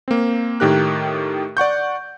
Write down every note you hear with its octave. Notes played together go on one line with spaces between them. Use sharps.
A#3 C4
A2 D#3 G4 A#4 F#6
D5 F#5 C#6 G6